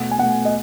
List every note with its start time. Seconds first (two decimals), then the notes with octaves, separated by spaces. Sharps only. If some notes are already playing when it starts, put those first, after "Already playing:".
Already playing: B2 A3 F#5
0.11 G#5
0.18 B2 A3 F#5
0.45 D#5